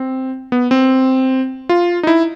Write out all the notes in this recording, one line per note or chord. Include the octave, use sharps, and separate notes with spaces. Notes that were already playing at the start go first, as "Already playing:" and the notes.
Already playing: C4
B3
C4
F4
D#4
E4